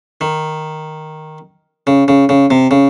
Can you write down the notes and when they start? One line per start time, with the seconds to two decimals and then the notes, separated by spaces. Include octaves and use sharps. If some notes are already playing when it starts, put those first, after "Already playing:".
0.21 D#3
1.87 C#3
2.08 C#3
2.29 C#3
2.51 C3
2.71 C#3